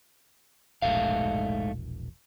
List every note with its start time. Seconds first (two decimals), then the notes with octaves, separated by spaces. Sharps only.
0.82 E1 A#1 G#2 A3 F5